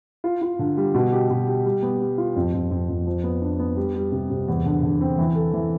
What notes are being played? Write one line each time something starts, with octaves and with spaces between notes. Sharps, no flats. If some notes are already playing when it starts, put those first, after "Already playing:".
F4
F4
D3
G3
B2
G4
B2
G4
G3
B3
G3
F4
F2
F2
F2
F2
F3
B3
D4
B3
G3
G3
C3
C3
E2
D3
D3
C4
E3
A4
E3